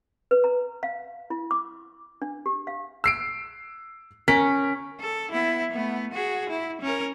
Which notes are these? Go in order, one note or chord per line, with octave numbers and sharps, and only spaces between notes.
B4
A#5
F5
E4
D6
D4
G4
F5
E6 C7 D7
C#4 A#4 B6
A4
B3 E4
A3 B3
F#4 G#4
E4
C#4 A#4